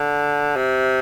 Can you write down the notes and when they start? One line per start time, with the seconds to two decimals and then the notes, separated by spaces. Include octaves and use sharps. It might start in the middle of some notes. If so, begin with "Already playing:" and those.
Already playing: D3
0.56 C3